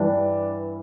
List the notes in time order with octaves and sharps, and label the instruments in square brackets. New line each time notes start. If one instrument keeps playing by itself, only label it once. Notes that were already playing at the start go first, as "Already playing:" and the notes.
Already playing: [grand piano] G2 E3 G3 D4